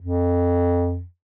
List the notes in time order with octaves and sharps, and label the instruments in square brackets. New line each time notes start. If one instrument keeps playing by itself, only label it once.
[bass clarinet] F2